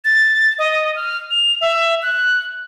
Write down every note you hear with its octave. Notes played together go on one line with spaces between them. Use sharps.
A6
D#5
F6
F7
E5
F#6